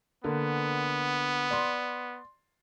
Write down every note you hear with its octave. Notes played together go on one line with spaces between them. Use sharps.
D3 A#3 B3
D5 C6